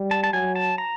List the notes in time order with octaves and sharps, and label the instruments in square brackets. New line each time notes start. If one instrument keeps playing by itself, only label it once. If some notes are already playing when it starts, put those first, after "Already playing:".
Already playing: [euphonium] G3
[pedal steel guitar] A5
A5
[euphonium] F#3 [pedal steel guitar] G#5
[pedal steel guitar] A5
A#5